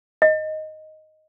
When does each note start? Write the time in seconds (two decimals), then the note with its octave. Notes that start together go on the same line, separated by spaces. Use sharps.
0.22 D#5